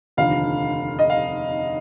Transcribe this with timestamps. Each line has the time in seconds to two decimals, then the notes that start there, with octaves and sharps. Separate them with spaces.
0.17 F1 D#2 D3 F3 F5
0.99 D#5
1.10 F5